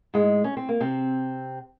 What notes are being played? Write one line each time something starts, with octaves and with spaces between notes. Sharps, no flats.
G#2 G#3
C#4
C4
A#3
C3 C4